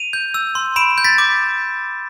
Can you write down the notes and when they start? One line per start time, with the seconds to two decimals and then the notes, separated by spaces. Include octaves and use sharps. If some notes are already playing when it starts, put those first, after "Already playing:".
Already playing: D#7 F7
0.13 G6
0.34 E6
0.55 C6
0.76 B5 D7 E7
0.98 G6
1.04 A6 B6
1.18 D6